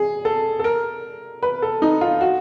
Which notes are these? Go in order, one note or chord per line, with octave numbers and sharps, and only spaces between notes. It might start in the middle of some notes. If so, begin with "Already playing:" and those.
Already playing: G#4
A4
A4
A#4
B4
A4
D#4
F4
F#4